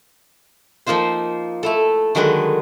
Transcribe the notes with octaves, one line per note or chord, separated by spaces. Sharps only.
F3 A#3 D#4 F4 C5
A3 E4 A4
D3 D#3 F#3 G#3 A#4 B4